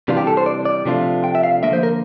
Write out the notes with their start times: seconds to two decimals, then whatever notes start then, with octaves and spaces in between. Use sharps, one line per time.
0.08 C3 E3 G3 D4 F4
0.17 G4
0.27 A4
0.37 C5
0.46 D5
0.65 D5
0.85 C3 F3 A3 D4 F4
1.24 G5
1.35 E5
1.43 F5
1.63 D3 F3 A#3 E5
1.73 C5
1.83 A#4